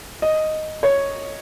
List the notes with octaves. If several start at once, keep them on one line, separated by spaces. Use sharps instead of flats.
D#5
C#5